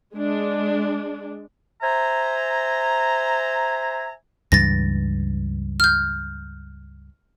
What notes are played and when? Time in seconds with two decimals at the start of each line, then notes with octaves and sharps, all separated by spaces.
0.15 G#3 D4
1.82 C5 E5 G#5 A#5
4.52 C#2 G2 E3 A6 A#6
5.80 F6 G6